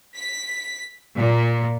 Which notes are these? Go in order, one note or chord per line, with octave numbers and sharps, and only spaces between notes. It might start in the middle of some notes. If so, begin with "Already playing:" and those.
B6
A#2